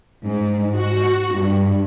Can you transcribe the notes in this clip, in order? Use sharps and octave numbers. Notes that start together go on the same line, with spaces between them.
G#2
F#4
G2